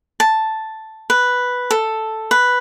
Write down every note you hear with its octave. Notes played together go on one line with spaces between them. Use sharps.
A5
B4
A4
B4